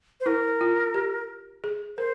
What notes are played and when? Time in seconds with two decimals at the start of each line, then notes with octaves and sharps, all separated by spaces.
0.20 C5
0.26 E4 A#4
0.61 F4
0.94 G4
1.64 G#4
1.98 A#4 C5